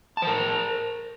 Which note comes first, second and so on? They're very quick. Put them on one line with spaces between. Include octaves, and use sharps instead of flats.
A5 C5 A#4